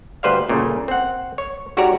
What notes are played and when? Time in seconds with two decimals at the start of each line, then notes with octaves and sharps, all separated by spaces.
0.23 D2 G2 B4 C5 D5 F5
0.49 G1 A#2 C#3 A3
0.88 C4 F#5
1.38 C#5
1.77 G#2 F#4 G4 C#5 D5 A#5